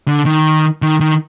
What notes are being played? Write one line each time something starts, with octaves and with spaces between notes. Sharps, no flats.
D3
D#3
D#3
D#3